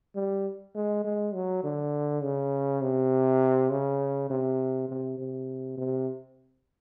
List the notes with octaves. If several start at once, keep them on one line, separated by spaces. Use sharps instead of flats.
G3
G#3
G#3
F#3
D3
C#3
C3
C#3
C3
C3
C3
C3